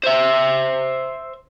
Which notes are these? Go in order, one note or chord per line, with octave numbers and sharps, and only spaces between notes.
C5 E5